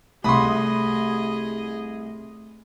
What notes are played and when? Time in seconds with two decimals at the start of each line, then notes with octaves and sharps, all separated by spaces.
0.24 C2 A3 G#4 D#5 B5 C6 D#6